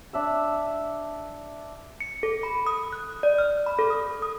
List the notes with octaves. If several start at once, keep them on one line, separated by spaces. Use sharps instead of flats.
D4 E5 E6
C#7
A4
B5
D#6
F#6
D5
F6
B5
A4
D#6
D#6